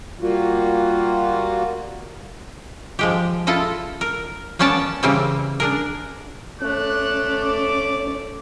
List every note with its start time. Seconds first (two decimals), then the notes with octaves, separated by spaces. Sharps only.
0.21 G3 A#3 F4 F#4
2.99 F3 G#3 G4
3.47 E4 F4 A4 D#5
4.01 A#4
4.59 A#3 B3 C#4 D5 A5
5.03 C#3 E3 G3 A#3 C4
5.60 D4 G#4 A#4
6.61 A3 C#4 D5 F#6
7.43 D6